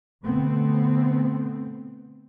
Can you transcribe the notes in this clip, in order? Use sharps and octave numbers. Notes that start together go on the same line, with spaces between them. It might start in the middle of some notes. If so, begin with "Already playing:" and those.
B2 D3 A3 B3 C4